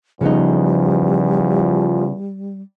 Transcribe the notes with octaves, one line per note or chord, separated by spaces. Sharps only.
E2 C#3 F3 G3 B3 D#4